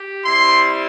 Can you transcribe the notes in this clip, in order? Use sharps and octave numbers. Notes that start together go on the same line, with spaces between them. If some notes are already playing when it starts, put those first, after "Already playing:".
Already playing: G4
G3 C4 E4 C6